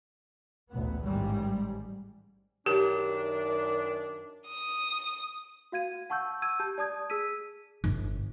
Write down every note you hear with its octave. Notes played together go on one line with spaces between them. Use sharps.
A1 D2 A#2 B3
A1 G#2 D#3 G3 G#3
F#2 D#3 D4 G4
D#6
F#4 F5 G#6 D#7
F#5 A5 C#6 E6 G6
E6 G#6 D#7
G4 A5 G6
D5 A5 D#6 G#6
G#4 E6 B6 D#7
G1